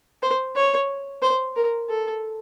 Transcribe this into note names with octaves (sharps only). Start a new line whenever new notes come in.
C5
C#5
C5
A#4
A4